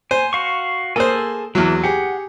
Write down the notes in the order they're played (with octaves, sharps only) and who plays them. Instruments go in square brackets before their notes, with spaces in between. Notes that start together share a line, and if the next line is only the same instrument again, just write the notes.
[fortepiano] C5 [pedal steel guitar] G#5
[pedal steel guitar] F#4 F5 C#6
[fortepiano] A#3 C5 [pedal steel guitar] G#4 A4 G#5
[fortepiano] E2 F#3 [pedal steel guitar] E3
[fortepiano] G4 G#4 [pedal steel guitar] F#5